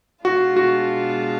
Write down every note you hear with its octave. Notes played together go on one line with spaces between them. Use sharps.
B2 G#3 D4 F4 F#4
F#4